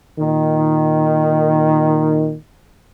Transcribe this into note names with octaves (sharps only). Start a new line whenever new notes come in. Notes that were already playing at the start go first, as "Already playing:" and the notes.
A#2 D#3